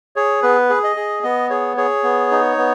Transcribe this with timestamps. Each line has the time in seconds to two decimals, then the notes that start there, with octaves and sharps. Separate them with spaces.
0.16 G#4 C#5
0.42 B3 B4
0.69 G#4
0.84 D#5
0.96 G#4
1.23 B3 D#5
1.50 G#4 C#5
1.77 G#4 C#5
2.04 B3
2.31 D#4
2.57 B3